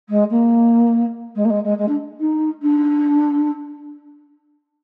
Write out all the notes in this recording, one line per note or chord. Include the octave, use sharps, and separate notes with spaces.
G#3
A#3
G#3
A#3
G#3
G#3
G#3
D4
D#4
D4